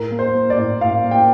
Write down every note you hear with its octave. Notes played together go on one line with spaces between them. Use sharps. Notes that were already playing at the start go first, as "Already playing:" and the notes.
Already playing: A2 A#4
A#3
C5
A#3
D5
A2
A2 F5
A#3
G5